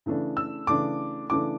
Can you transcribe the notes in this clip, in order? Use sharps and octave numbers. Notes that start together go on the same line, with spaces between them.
C#3 E3 A3 D4
E6
C#3 E3 A3 D4 D6
C#3 E3 A3 D4 D6